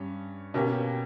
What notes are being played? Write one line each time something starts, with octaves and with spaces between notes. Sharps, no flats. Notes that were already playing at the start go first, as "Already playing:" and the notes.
Already playing: G2 C#4
B2 A#3 C#4 G4